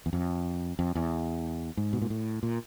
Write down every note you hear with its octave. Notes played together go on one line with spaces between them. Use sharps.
E2
F2
F2
E2
G#2
B2
A#2
A2
A#2